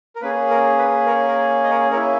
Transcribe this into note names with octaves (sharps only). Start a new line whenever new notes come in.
A#4
A#3 C#4 G#4 B4
A#4
B4
A#4 C#5
A#4
D#5
A#4 C#5
A#3 C#4 E4 A#4 C#5